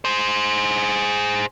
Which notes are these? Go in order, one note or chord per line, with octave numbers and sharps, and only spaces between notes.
G#4 C5